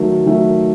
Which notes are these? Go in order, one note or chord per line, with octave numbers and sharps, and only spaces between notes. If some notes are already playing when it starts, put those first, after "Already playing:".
Already playing: D#3 F#3 A3
D#3 F#3 A3